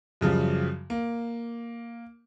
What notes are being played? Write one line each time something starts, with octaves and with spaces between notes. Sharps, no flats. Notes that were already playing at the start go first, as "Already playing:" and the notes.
F#2 C#3 F3 G3
A#3